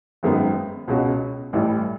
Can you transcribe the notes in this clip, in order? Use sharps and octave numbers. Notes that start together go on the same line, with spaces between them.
G#1 F#2 D#3 G#3 B3
C#2 B2 G#3 C#4 F#4
A1 A2 E3 G3